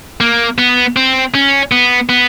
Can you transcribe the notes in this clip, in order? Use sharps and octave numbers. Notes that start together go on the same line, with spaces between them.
A#3
B3
C4
C#4
B3
B3